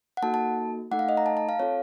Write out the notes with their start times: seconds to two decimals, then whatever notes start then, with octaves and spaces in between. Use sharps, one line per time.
0.17 F#5
0.22 A#3 D#4 F#4 A4 A5
0.34 A5
0.91 A3 D#4 A4 F#5
0.99 F5
1.09 D#5
1.17 A#5
1.26 A5
1.37 A5
1.49 F5
1.59 C4 F4 A4 C#5